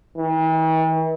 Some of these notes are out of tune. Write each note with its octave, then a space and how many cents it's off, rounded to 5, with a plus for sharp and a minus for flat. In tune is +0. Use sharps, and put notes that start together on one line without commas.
E3 -45